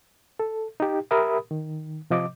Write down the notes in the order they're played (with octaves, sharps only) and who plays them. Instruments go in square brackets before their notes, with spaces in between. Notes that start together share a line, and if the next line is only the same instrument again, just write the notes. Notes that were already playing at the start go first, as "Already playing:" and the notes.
[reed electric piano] A4
D#4 G4
G4 A#4 E5 B5 D#6
D#3
C3 F3 D#5 D6